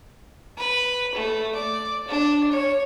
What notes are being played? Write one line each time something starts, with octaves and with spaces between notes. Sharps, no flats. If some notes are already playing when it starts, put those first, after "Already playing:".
B4
A3
D5
D4
C#5